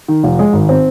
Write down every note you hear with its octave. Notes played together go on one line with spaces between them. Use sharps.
D#3
F1
G#3
G#1
C4